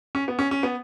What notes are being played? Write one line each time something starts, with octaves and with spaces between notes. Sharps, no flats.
C#4
B3
C#4
C#4
B3